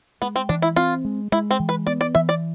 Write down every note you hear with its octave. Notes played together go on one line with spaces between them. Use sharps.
G#3 B3
C4
E3 D4
E4
C4 F4
G#3
G#3 E4
C4
E3
B4
B3 D5
D5
E3 E5
D5